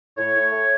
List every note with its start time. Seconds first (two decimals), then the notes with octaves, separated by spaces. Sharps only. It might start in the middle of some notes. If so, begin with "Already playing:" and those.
0.17 A2 C#5
0.34 A2
0.51 A3